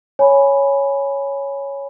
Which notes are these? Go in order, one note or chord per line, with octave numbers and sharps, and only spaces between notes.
C#5 G#5 B5